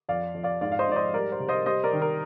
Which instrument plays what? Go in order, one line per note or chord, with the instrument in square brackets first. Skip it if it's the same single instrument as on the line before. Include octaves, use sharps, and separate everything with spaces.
[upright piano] F2 D5 F5
F2
D5 F5
G#2 D5 F5
F5
C5 D#5
G#2 D5
C5 D#5
G3 A#4 D5
C5
C3
C5 D#5
G3 C5 D#5
A#4 D5
D#3
A#4